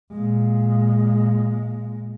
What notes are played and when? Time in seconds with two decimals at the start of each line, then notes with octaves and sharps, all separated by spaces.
0.12 A#2 G#3